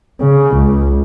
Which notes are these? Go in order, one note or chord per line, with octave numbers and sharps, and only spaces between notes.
C#3
C#2